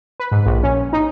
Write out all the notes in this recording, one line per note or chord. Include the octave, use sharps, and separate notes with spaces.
B4
G#2
A#1
C#4
D#4